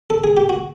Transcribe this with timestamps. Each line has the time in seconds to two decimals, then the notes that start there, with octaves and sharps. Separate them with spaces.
0.10 A4
0.24 G#4
0.37 G4
0.49 F#4